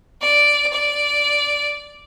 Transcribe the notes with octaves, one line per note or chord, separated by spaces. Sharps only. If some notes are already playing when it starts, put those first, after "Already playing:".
D5
D5